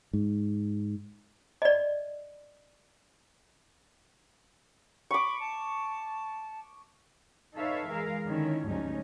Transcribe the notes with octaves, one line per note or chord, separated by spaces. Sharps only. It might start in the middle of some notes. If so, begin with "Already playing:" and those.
G#2
D5 D#5
B5 C#6 D6
A5
D#4 A4 B4 C#5 E5 F5
E3 G#3 G#4 A#4 F5
D3 D#3 C#4 E4
D2 G#2 F#3 G3 C#4 D#4